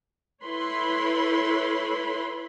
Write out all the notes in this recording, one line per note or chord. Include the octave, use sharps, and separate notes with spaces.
E4 A4 B4 C#5 B5 C6